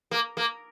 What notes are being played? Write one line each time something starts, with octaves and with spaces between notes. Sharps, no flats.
A#3
A#3